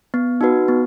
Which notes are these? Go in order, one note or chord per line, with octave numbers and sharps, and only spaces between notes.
B3
D#4 F#4 B4
B3